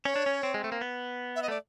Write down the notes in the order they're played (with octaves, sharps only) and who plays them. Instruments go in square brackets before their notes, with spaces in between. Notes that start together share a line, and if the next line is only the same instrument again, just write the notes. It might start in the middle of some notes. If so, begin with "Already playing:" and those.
[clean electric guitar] C#4 [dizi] C#5
[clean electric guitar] D4
C#4
C4
G#3
A3
A#3
B3
[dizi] E5
D#5
[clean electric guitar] A3 [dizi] D5